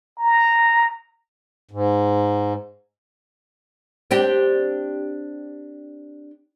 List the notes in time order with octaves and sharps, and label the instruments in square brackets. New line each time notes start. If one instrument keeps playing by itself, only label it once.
[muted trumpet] A#5
[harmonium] G#2
[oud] C4 D4 G4